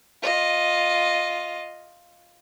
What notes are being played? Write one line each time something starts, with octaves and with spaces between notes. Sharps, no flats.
F4 D#5